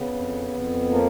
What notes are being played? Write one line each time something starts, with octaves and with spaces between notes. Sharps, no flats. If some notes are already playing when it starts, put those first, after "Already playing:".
Already playing: C#3 B3
F2
F2
F3 A#3